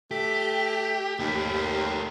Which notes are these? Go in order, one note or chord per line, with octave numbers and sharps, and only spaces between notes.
A3 G4 B6
D#2 A3 G4